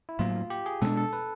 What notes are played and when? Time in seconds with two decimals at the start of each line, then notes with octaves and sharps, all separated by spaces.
0.09 E4
0.19 A2 F#3 A#3 F4
0.50 G4
0.66 G#4
0.82 B2 G#3 B3 D4 A4
0.97 A4
1.13 B4